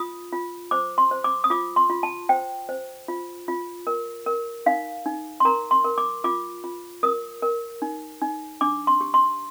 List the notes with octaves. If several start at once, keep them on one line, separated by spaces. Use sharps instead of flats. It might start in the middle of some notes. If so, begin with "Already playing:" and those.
Already playing: F4 D#6
F4
C5 D6
C6
C5
D6
D#6
F4 D6
C6
F4
A5
C5 G5
C5
F4
F4
A#4
A#4
D#4 F5
D#4
C6
A#4 A#5
C6
A#4
D6
F4 D6
F4
A#4 D#6
A#4
D#4
D#4
D4 D6
C6
G4
C6